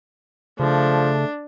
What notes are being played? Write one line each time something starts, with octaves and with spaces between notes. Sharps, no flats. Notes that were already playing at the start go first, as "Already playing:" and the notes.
C#3 F3 A3 D4